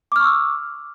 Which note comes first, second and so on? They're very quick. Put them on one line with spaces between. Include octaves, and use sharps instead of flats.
D6 F6 C#6 E6